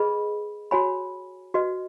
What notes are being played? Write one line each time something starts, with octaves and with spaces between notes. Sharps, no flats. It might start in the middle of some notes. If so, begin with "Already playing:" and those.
Already playing: G#4 B4 D#5 B5
F#4 C#5 G#5 B5
F#4 B4 D#5